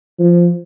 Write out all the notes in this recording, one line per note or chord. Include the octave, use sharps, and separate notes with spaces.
F3